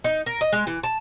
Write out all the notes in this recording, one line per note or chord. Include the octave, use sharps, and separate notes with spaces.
D#4
A#4
D#5
G#3
E3
A5